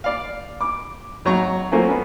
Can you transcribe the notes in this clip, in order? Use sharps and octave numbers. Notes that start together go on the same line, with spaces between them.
D5 F5
D6
G#1 F#3 C#5 A#5 C#6
F#3 A3 A#3 C4 C#4 F4
B3 C#4